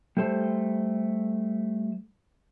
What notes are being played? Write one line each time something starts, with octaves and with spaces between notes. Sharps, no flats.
G3 A3 A4 C5